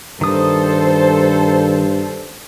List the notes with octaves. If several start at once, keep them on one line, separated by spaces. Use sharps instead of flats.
G2 D#3 A4 C5 D#6